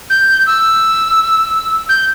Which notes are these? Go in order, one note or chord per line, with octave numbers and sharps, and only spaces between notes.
G6
E6
G6